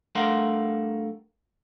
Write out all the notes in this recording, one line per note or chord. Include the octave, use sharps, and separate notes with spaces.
G2 A3 A#4 F5 F#5 C6